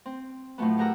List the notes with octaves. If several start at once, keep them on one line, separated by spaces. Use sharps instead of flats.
C4
A2 F3 F#3 A3 B3
G4 G#4 A#4 F#5 A#5 E6